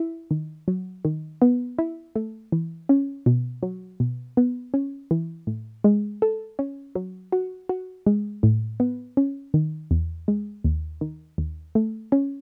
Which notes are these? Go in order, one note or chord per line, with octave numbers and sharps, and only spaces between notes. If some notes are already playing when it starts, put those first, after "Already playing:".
Already playing: E4
D#3
F#3
D#3
B3
E4
A3
E3
C#4
B2
F#3
B2
B3
C#4
E3
A2
G#3
A4
C#4
F#3
F#4
F#4
G#3
A2
B3
C#4
D#3
E2
G#3
D#2
D#3
D#2
A3
C#4